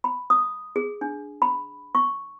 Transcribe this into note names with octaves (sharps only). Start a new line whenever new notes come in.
B5
D#6
G#4
D4
B5
C#6